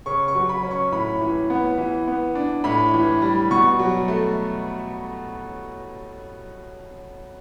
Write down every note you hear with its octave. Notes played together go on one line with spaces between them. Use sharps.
C#3 C#6
C#6
F#3
B5
C#4
C#6
A2 B5
E3
B3
E3
B3
D4
A2 B5
E3
G3
B2 C#6
F#3
A3